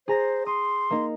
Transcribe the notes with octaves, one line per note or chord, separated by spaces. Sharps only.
G#4 C5 A#5 A#6
C6 D#6
A#3 D#4